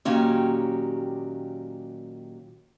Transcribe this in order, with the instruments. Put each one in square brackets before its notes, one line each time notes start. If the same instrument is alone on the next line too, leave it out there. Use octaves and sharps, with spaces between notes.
[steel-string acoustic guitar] A#2 D#3 F#3 C#4 G4